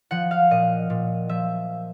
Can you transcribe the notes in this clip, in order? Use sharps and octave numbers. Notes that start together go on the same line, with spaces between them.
F3 F#5
F5
A#2 D#5
A#2
F3 E5